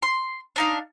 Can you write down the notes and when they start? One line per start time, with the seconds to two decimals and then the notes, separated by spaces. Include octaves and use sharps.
0.03 C6
0.56 D4 D#4 F5